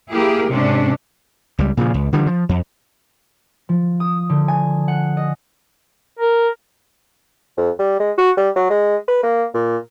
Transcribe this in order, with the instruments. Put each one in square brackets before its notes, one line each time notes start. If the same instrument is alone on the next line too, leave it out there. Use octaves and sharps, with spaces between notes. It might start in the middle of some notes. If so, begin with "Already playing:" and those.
[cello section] A#3 E4 G4 G#4 A#4
G#2 C3 C#4 D4
[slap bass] C#2 G3
A#2 C#3 F3
C#2
D3 E3 F3 G3
F3
F2
[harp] F3
D#6
D3
G#5
F#5
D#5
[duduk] A#4
[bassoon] F2
G3
G#3
F#4
G3
F#3
G#3
B4
A#3
A#2